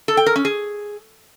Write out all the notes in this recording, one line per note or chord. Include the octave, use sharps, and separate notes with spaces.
A4
G5
A#4
C#4
G#4